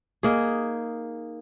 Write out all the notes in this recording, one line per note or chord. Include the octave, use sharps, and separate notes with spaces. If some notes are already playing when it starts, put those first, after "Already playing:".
A#3 D#4 G#4